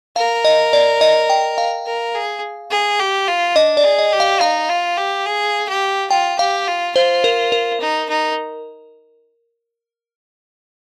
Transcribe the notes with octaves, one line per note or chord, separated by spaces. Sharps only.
A#4 F5
D#5
D5
D#5
G5
F5
A#4
G#4
G#4
G4
F4
D4 D#5
D5
G#4
D#5
G4
F5
D#4 F5
F4
G4
G#4
G4
F4 G5
G4 F5
F4
F4 C5
A#4
A#4
D#4
D#4